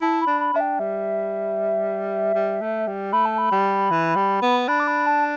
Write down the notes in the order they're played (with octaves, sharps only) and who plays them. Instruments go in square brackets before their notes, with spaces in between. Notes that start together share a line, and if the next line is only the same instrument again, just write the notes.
[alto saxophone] E4 [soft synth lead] A5
[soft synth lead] B5
[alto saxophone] D4
[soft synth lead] B5
[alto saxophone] D4 [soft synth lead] E5
[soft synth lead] G5
[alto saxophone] G3 [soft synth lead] E5
[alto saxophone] G3
A3
G3
[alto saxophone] A3 [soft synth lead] B5
[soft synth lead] A5
B5
[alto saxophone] G3
E3
G3
B3
[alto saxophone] D4 [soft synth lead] B5
[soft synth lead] D6
B5
A5